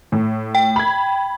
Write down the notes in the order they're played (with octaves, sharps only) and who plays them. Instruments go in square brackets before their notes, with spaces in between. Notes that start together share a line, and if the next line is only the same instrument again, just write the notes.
[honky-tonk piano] A2
[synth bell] G5
[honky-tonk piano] B5 G#6